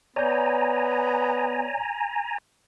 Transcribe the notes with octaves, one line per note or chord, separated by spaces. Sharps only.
B3 C#5 D5 G#5 A#5 G6